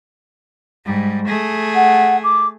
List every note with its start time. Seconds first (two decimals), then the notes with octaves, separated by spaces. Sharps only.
0.85 G#2 G3
1.28 A3 G#4
1.74 F#5
2.23 D6